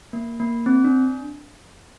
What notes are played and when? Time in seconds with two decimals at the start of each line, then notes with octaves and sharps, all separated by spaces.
0.13 A#3
0.40 A#3
0.66 C4
0.85 D4